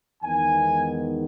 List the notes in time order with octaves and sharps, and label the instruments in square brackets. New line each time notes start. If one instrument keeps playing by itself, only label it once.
[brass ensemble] E2 D#3 G#3 B3 D#4 G#5